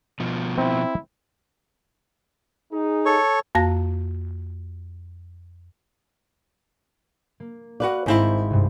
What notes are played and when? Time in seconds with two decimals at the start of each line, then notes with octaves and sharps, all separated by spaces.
0.20 B2 F3
0.58 C4 E4
2.73 D#4 G#4
3.05 A4 C#5 C#6
3.55 F2 A#3 F#4 F5 A5 A#6
7.40 A#3
7.80 F#4 B4 D5 F5
8.06 G#1 G#2 C4 E4
8.50 C2 G2